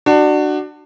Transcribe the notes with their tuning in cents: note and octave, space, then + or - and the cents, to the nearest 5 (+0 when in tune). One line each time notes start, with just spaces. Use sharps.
D4 +25 F#4 +10